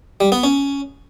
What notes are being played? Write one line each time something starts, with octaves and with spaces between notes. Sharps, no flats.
G3
B3
C#4